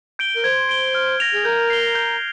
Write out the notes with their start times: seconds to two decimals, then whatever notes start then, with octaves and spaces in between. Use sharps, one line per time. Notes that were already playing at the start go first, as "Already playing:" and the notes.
0.19 G6 D7 G7
0.36 A#4
0.44 C5 G#6
0.69 D7 G7
0.95 F6
1.20 A#6 F7
1.34 G#4
1.45 A#4 G6
1.70 C7 G7
1.95 G6